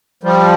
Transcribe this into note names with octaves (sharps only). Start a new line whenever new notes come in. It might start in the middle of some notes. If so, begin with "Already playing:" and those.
F3 G3